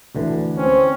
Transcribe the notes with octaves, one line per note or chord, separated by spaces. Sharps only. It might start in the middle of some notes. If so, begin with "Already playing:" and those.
D2 D3 E3
C4 C#4